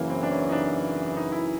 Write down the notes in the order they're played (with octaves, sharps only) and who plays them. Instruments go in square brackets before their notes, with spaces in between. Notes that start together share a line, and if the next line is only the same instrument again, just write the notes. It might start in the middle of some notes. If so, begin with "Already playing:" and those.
Already playing: [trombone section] F#2 C#3 E3 [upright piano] A#3
[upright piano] C4
D4
C#4
D#4
D4
D#4
E4